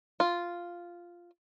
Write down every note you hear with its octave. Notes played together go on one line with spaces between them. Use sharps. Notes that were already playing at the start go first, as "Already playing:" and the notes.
F4